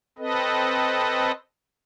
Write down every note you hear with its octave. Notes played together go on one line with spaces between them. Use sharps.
C4 A4 B4 D#5